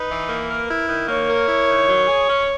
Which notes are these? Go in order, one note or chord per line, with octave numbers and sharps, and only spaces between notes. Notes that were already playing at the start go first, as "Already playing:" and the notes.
Already playing: D#4 B4
E3
A#3
A#4
E4
D#3
A#3 C#5
A#4
E4
D#3
F#3
G#4
C#4